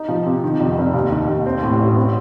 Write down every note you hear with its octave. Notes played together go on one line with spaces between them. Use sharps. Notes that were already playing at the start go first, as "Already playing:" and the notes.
Already playing: D#4
F3
C3
D#3
F2
F1
D#2
D#3
D#2
C4
A2
A1
C4